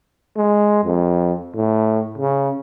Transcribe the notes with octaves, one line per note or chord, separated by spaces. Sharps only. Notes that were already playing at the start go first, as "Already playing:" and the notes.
G#3
F2
A2
C#3